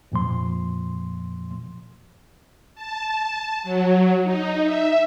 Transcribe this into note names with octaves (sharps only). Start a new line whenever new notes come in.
F2 A#2 F3 C6
A5
F#3
D#4
E5